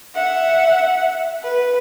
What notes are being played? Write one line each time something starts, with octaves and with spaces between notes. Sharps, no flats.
E5 F#5
B4